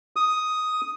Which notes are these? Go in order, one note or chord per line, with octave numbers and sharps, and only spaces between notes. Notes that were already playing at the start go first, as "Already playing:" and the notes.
D#6